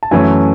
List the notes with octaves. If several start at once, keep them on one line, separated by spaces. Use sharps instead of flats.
A5
F#2 E3 A3 C#4 G#5